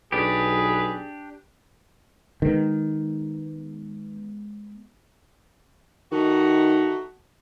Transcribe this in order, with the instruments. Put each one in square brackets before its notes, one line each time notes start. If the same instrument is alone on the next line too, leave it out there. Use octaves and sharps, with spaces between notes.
[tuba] B1 [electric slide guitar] D4 G4 [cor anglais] G#4 [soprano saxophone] B4
[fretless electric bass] D#3 [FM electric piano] G#3 B3
[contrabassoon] D#3 [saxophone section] A3 D#4 F#4